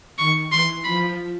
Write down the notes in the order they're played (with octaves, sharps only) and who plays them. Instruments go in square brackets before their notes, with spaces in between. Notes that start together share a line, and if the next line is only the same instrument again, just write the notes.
[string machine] D#3 [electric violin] C#6
[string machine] E3 [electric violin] C6
[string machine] F3 [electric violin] B5